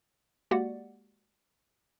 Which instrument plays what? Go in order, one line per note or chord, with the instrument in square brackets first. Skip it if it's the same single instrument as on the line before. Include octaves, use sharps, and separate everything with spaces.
[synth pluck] G#3 A#3 F#4 G4 D5 F#5